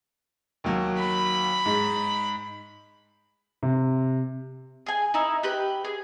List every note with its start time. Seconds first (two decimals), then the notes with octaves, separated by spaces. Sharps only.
0.64 D#2 F#3
0.98 B5
1.65 G#2
3.63 C3
4.86 G#4 G#5
5.14 D#4 E4
5.43 G4 B4 B5
5.85 G#4